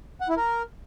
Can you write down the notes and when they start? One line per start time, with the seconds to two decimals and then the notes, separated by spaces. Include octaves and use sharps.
0.21 F#5
0.29 E4
0.37 A#4